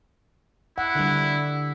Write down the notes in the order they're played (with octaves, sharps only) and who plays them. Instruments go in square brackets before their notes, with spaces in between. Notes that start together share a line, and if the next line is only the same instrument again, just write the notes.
[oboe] E4 [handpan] F#5
[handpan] D3 G3